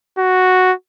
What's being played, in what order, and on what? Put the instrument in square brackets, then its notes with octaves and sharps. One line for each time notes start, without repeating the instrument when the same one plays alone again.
[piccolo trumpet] F#4